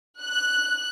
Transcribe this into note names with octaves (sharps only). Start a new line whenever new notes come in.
F#6